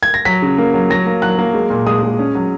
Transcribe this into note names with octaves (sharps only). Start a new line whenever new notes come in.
G#6
A#6
F#3 B6
C#3
A#3
F#3
F#3 A#6
A#3
F#3 F#6
A#3
G#3
A#2
G#3 D#6
G#3
C#4
F#3